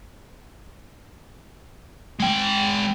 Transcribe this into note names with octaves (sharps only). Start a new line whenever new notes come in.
G#3 G5